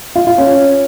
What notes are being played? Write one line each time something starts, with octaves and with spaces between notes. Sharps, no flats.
F4
F4
C#4